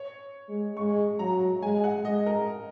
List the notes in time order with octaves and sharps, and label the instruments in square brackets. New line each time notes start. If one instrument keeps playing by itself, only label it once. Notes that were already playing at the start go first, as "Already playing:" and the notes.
Already playing: [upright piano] C#5
[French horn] G#3
[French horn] G#3 [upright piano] C#6
[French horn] F#3 [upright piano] A#5
[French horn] G#3 [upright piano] G#5
[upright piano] F#5
[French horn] G#3 [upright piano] D#5
[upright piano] A#4